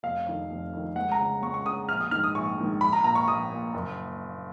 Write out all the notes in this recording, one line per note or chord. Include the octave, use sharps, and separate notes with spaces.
F1 F5
F2 D#3
F1
F2 D#3
C#2 F#5
A#5
C#3
C#2 C#6
C#6
C#3 D#6
A#1 F6
D#6
G#2 D#3 F6
D#6
A#1 C#6
G#2 D#3
A#1 B5
A#5
A#2 A#5
C#6
A#1 D#6
A#2
F#1